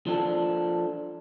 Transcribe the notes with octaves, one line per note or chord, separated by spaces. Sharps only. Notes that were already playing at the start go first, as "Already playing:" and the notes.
F3 D4 A4